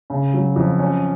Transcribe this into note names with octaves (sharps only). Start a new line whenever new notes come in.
C#3
F#3
F2
C#4